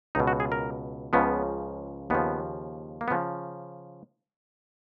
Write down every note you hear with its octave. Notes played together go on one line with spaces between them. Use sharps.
C#2 B2 D#4
F#4
G#4
A#4
C#2 C#3 F3 B3
D#2 C#3 F3 B3
A#3
B3
C#3 F3